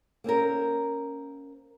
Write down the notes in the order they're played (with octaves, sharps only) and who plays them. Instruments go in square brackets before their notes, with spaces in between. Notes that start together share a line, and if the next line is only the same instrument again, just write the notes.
[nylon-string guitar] A#3 C4 C#4 A#4